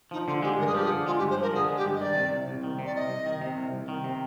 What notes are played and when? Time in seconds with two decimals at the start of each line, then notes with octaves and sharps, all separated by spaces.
0.11 F3 D#4
0.27 D3 F4
0.42 G#3 G4
0.58 G2 A#4
0.66 G#4
0.74 F3 G4
0.82 G#4
0.91 D3
1.06 G#3 F4
1.18 G4
1.21 G2
1.29 C5
1.38 F3 A#4
1.54 D3 G#4
1.68 G#3
1.76 G4
1.85 G2
1.95 D#5
2.00 D#3 D5
2.15 C3
2.31 C2
2.48 C2
2.64 D#3
2.79 C3
2.85 D5
2.95 C2 D#5
3.10 C2
3.26 D#3
3.41 C3
3.57 C2
3.73 C2
3.88 D#3
4.04 C3